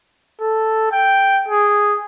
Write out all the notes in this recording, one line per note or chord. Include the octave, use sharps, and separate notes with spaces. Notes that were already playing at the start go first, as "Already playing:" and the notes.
A4
G5
G#4